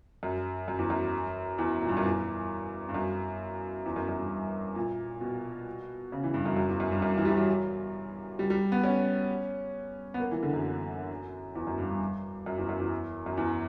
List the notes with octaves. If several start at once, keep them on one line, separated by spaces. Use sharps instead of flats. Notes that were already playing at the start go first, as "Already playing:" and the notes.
F#2
F#2
E2
F#2
E2
A#2
G2
F#2
E2
G2
F#2
E2
F#2
F#2
G2
A#2
B2
C#3
E3
G2
F#2
F#2
E2
F#2
G2
F#2
E3
G3
F#3
G3
G3
B3
C#4
B3
A#3
E3
D3
F#2
E2
F#2
G2
G2
F#2
E2
F#2
E2
F#2
E2